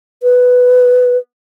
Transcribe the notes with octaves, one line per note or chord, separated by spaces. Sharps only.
B4